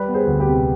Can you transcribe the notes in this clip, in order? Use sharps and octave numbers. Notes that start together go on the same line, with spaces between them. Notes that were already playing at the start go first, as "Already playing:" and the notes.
Already playing: G3 B4 D5
B3
G#4 C5
D2
G4 B4
C3